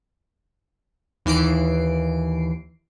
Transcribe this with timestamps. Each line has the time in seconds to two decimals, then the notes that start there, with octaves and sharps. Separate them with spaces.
1.25 D#2 E3 C7 D7